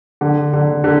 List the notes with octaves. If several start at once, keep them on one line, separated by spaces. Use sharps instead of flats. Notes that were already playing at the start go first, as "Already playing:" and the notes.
D3
D3
D3